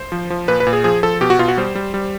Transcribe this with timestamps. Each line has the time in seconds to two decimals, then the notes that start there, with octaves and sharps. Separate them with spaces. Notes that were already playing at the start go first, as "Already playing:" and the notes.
Already playing: C5
0.12 F3
0.30 F3
0.48 A#2 B4
0.60 B4
0.67 A#2
0.73 G#4
0.84 F3 G#4
1.03 F3 A4
1.21 B2 G4
1.30 F#4
1.39 B2 F4
1.48 F#4
1.57 G3 C5
1.75 G3
1.94 G3